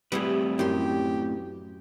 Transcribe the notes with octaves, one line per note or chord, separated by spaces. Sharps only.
A2 G3 C4 E4 G#4 B4
F#2 C#4 E4 G4 C6